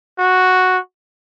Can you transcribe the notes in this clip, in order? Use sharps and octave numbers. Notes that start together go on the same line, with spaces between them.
F#4